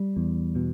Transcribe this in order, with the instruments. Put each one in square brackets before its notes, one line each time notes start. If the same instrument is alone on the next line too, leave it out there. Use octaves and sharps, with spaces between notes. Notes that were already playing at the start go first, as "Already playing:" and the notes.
Already playing: [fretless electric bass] G3
E2
B2